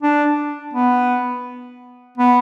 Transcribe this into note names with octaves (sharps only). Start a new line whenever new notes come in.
D4
B3
B3